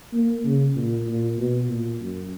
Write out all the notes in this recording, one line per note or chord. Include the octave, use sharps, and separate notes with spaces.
A#3
C#3
A#2
A#2
B2
A#2
F#2